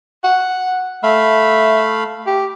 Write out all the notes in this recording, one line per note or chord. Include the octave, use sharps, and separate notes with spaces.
F#5
A3 E5 F5 B5
G4